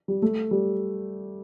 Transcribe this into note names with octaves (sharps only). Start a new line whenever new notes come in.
G3
A3
G3